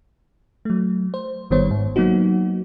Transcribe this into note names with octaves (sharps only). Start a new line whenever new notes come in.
F#3 A3
C5
G1 D#3 G3 B3 C5 C#5
G#2
F#3 A#3 B3 D#4 F#4